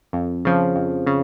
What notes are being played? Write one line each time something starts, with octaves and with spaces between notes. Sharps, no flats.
F2
C#3 F3
F2
C#3